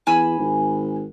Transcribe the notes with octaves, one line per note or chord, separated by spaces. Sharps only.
E2 G#5 B5 E6
G#1